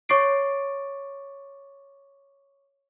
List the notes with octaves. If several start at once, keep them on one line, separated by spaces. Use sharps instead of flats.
C#5 C#6 D6 A6 C7 D7